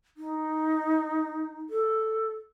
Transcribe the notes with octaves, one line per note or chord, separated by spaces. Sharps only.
D#4
A4